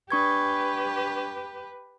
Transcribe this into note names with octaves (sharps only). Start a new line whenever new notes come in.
D4 G4 B4 C#6 G#6